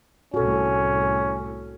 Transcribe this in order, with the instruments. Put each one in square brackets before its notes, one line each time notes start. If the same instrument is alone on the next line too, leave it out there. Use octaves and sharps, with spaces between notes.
[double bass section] C2 A2 [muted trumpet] C#4 [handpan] F#4 A4